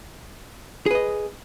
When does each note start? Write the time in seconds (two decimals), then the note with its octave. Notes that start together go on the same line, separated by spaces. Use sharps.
0.86 G#4
0.91 B4
0.95 D#5